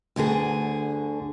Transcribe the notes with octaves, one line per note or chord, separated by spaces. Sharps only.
D2 G2 D3 G#4